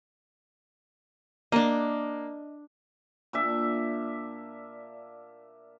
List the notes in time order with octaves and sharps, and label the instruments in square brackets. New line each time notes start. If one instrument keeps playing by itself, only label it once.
[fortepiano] A#3 [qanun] D4 D#5
[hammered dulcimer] A#2 D4 E5